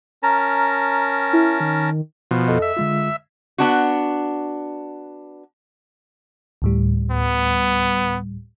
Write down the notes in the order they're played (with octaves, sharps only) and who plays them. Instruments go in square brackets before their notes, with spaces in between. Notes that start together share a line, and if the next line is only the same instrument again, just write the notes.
[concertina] C#4 A#4 A5 [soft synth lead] A#5
[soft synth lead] E4
D#3
[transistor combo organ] B2 F3
[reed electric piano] F2 A4 D#5
[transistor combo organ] E5
[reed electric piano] D3 G#3 F4
[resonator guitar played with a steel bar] B3 D4 F#4
[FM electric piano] D2 A2 G3
[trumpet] B3